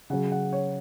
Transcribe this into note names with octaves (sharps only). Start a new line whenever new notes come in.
C#3 F#3 F#5
F#5
C#5